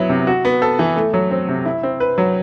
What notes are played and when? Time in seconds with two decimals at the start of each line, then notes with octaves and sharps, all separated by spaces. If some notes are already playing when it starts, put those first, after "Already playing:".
Already playing: F#3 B3 E4
0.09 C3
0.27 F#4
0.45 B3
0.62 A4
0.79 E3
0.96 A3
1.14 F#3
1.31 C4
1.48 C3
1.65 E4
1.83 C4
2.00 B4
2.18 F#3